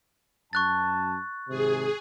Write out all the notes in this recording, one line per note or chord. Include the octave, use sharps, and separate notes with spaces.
F#2 A5 C#6 F#6 A6
G#1 C3 G#4